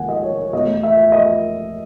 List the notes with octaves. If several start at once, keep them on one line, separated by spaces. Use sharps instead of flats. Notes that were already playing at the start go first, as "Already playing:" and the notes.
Already playing: D#2 D#3 G#3 F#5 G#5
D#5
C#5
C#5
E2 B2 A3 D#5
E5
D#5